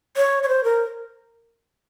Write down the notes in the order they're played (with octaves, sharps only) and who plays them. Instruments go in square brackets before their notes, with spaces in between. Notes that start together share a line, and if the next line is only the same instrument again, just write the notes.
[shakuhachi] C#5
C#5
C5
A#4